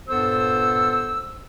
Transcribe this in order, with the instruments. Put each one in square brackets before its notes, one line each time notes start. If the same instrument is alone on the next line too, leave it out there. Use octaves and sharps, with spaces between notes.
[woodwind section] G2 A#2 B3 A4 C5 E6